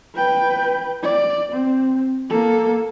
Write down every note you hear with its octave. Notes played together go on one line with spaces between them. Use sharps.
B4 G5
D5
C4
A#3 A4